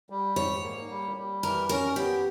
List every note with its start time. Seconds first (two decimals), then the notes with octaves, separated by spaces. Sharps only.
0.10 G3
0.36 G#2 C#5
0.63 A#3
0.89 G3
1.17 G3
1.43 E3 A#4
1.69 C#4 A#4
1.96 B3 G4